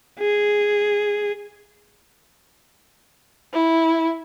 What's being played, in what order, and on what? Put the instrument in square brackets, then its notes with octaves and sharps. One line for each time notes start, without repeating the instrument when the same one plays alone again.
[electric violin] G#4
[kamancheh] E4